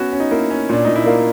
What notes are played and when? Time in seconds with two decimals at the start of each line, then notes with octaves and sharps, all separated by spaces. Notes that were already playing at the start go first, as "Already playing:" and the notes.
Already playing: B3 C#4 F#4
0.13 C#4
0.20 D#4
0.31 A#3 E4
0.50 C#4
0.69 A#2 D4
0.85 A#2 D#4
0.96 E4
1.06 A#3 F4